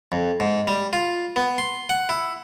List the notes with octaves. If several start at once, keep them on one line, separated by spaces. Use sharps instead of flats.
F2
G#2
G3
F4
B3
C6
F#5
E4